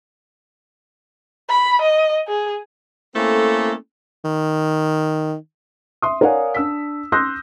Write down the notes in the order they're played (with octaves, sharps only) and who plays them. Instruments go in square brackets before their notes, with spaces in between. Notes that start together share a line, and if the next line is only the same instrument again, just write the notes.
[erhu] B5
D#5
G#4
[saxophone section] A3 A#3 C4 C#4 E4 A4
[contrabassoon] D#3
[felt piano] E5 C6 D#6
A#4 C#5 D5 F5 F#5 G#5
D4 E6 B6
C6 D#6 E6 F#6 G6 A#6